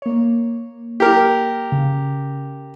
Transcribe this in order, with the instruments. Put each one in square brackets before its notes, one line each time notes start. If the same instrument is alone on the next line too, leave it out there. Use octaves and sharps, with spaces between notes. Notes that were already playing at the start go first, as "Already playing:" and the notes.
[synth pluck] A#3 C#5
[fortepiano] G4 A#4
[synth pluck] C#3